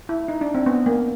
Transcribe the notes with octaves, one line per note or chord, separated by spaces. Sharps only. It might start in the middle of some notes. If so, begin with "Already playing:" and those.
E4
D#4
D4
C4
B3
A#3